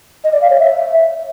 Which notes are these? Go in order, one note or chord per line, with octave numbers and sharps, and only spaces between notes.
D#5
D5
F5
C#5
E5